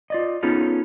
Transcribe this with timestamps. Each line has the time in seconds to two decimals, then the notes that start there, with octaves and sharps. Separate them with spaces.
0.10 F4 D5 D#5
0.43 B3 C#4 D#4 F4 G#4 A4